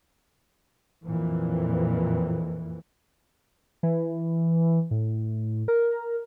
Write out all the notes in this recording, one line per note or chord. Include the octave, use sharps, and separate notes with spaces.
F2 A#2 E3
E3
A2
A#4